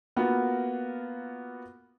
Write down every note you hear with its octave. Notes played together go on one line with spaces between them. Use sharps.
A#3 B3 F4 F#4